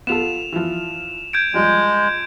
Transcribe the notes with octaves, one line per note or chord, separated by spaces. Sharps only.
B3 F4 A4 E7 F7
E3 F3
G6 G#6 D7
F3 G3 G#3